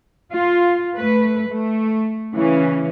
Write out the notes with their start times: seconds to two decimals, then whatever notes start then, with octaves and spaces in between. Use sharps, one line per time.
0.33 F4
0.97 A3 B4
1.49 A3
2.34 C#3 E3 C#4